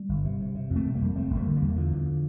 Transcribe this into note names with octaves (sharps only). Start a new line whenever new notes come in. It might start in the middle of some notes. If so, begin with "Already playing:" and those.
Already playing: G3
G1
C3
C3
C3
F2
A3 C4
C3
G3 A#3
F2
F1 A3 C4
F1
G3 A#3
D3
E2 G3 A#3
E2 D3 F3
E2